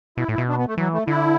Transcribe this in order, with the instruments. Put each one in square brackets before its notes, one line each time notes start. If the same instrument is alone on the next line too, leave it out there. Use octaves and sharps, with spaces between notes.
[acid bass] B2 [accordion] E4
[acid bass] A2
[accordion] E4
[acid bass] B2
[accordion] D4
B3
A3
[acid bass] E3 [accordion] F#3
[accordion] A3
[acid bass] D3 [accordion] E4